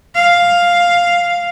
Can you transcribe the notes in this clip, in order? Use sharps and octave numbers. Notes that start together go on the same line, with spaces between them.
F5